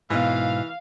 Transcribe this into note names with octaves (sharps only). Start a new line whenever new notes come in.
G#2 B2 E3 F5